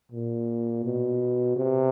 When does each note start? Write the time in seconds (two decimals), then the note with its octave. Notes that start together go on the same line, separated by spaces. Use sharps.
0.12 A#2
0.84 B2
1.56 C3